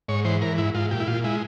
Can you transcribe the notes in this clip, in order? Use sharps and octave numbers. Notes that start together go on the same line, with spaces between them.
G#2 C#5
E3 C5
E3 A#4
G#2 E4
G#2 F4
A#2 G4
E4
A#2 F4
G#3 E4